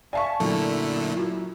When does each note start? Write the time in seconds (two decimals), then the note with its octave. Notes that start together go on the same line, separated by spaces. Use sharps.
0.13 D5 E5 F5 G#5 A5 C#6
0.40 F#2 A#2 D3 A3 E4
1.17 F4 F#4